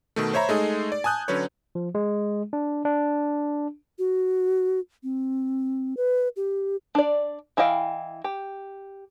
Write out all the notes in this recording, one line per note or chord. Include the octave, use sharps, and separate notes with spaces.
B2 D#3 A3
C5 C#5 E5 A#5 B5
G#3 A3 D#4 G#4
D5
G#5 A5 D#6 F#6 G6
D3 F#3 C#4 B4 C#5
F3
G#3
D4
D4
F#4
C4
B4
G4
D4 D5
E3 E4 D#5 F5 G5
G4